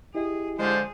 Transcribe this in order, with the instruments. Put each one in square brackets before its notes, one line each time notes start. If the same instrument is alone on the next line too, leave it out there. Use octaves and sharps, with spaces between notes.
[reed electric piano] E4 G4 D#5 [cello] G#4
[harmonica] D3 F3 C5 [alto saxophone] G#3 [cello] G#4